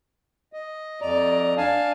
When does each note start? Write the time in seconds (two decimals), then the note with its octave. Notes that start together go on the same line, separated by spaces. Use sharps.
0.53 D#5
1.02 F2 D5 D#5 A#5
1.57 D4 F5 G#5 A5